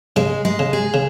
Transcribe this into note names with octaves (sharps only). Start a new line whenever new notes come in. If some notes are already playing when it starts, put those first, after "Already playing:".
C#3 G#3
G#3
C#3
G#4
C#3